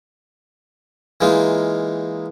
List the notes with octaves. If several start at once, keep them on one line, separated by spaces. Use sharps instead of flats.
E3 G#3 A#3 D#4 F4